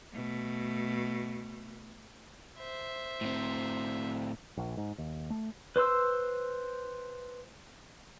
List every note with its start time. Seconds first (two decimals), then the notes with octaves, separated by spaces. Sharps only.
0.13 B2 A3
2.59 C5 E5
3.21 A2 C4
4.57 A#1
4.77 G#2
4.98 D#2
5.30 A3
5.76 B4 C5 C6 E6